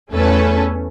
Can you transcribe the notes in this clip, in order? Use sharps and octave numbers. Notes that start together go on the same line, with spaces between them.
E2 A3 C#4 A4 B4